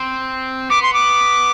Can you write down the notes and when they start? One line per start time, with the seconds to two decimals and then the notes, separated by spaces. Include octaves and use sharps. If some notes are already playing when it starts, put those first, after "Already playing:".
Already playing: C4
0.70 B3 D6
0.83 C6
0.94 D6